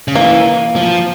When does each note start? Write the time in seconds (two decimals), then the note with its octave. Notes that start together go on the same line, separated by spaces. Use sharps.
0.08 C#3
0.15 E3 A#3
0.76 F3